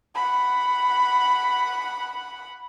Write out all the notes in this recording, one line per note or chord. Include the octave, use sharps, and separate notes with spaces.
F#5 B5